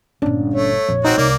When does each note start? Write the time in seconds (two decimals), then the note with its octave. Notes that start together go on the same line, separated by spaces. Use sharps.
0.22 G1 A#2 C#4 D4
0.54 A3 C#5
0.88 A#1 F2
1.05 C4 D#4 F#4
1.17 C2 A#3 D5